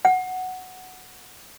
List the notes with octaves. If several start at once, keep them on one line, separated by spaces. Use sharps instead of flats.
F#5